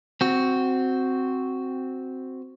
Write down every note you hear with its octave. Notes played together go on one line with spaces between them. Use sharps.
C4 F#4